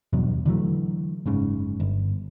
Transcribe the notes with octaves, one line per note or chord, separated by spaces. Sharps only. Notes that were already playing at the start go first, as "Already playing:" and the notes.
E2 G2 B2 F#3
D3 E3 F#3 A3
F#1 G#2 C#3
G1